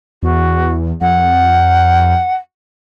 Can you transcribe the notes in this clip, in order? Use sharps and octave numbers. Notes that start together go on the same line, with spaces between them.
E2 F#4
F2 F#5